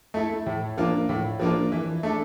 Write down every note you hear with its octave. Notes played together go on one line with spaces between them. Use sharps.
A3 E4 A4
A2
F3 A#3 D4 F4
A2
F3 A#3 D4 F4
E3
A3 D4 A4